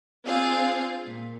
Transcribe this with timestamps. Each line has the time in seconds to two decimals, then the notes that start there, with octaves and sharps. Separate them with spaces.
0.25 C4 D4 F4 G#4 F5
1.05 A#2